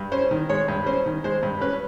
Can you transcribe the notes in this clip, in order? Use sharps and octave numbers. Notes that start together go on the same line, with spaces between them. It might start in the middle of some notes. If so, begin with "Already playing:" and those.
Already playing: G2
C#4 C5
D#3
G#3 C#5
G2
C#4 C5
D#3
G#3 C5
G2
C#4 B4